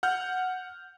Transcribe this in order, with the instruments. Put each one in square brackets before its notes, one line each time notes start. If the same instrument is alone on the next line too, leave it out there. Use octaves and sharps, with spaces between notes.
[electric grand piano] F#5 F6 G6